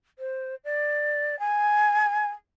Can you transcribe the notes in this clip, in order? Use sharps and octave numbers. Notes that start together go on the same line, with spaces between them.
C5
D5
G#5